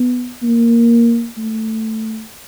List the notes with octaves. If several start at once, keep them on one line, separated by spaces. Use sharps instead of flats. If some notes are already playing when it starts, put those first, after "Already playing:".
Already playing: B3
A#3
A3